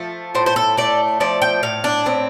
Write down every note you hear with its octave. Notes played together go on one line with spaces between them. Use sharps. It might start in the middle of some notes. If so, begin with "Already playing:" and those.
Already playing: F3 A3
A2 C5
C5
A4
A3 D5
F3 D5
G5
A2 F5
D4
A2 C4